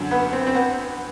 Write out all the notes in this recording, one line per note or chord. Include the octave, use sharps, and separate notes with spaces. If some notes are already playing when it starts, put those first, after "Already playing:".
Already playing: F#2 D3
B3
C4
C4
B3